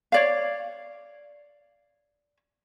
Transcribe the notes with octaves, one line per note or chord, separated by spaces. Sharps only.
C#5 D5 F5